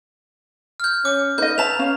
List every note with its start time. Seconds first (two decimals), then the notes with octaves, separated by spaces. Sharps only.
0.80 F6 G6
1.05 C#4 D6
1.38 D#4 B4 D#5 G6
1.58 B4 E5 A5 A#5 F7
1.79 C#4 F5